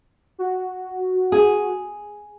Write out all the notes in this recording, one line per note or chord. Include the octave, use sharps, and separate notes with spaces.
F#4
G#4